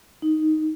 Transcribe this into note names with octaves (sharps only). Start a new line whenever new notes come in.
D#4